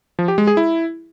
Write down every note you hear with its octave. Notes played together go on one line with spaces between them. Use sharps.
F3
G4
G#3
G#4
E4